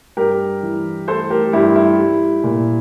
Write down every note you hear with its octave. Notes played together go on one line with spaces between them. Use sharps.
G2 G4 A#4
E3
A3 A4 C5
G4 A#4
G2 E4 G4
E4
G3
A#2